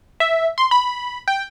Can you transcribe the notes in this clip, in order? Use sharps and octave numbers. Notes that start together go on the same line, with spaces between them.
E5
C6
B5
G5